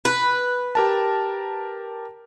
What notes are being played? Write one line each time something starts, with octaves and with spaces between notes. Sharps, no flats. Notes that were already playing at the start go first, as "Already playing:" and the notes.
B4
G4 A#4 A5